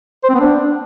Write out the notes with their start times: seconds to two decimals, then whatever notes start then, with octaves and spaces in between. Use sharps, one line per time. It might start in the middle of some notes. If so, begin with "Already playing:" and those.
0.24 C5
0.29 C4
0.35 B3
0.40 D4